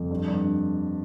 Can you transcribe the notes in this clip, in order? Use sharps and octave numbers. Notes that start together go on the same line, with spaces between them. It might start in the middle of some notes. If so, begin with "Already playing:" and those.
Already playing: F2
G2
G2